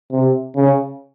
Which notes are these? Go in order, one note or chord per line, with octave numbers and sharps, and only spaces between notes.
C3
C#3